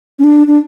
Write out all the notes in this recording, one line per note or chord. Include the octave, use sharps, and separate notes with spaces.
C#4
D4
D4